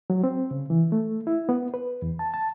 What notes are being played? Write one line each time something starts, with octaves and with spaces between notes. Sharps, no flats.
F#3
C4
C#3
E3
A3
E4
B3
B4
E2
A5
A5